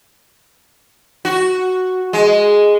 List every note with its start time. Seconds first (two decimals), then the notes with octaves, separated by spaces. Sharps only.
1.25 F#4
2.13 G#3